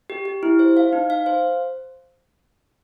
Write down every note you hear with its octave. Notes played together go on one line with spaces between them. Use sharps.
G4
G4
E4
C5
F5
D#4
F5
C5